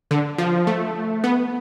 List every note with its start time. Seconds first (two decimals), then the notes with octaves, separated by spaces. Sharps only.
0.11 D3
0.38 F3
0.67 A3
1.24 B3